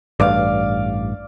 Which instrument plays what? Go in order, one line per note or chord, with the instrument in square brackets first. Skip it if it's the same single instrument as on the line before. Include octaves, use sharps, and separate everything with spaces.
[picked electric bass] A1 G2 [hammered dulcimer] D5 F5